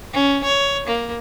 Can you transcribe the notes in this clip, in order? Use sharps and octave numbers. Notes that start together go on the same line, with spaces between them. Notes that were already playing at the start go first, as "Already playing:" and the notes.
C#4
C#5
A#3